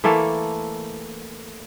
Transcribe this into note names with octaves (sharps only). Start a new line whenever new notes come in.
E3 A3 A#3 A4